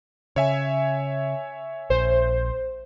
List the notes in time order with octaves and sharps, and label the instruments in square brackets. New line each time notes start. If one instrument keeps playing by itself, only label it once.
[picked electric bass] C#3 [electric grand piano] C#5 E5 G#5
[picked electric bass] A#1 [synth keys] C5